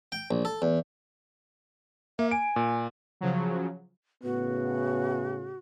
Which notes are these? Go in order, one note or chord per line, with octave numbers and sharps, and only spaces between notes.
G5
A#1
A4
E2
A#3 E5
G#5 D7
A#2
C#3 F3 F#3
A2 C#3 B3 F#4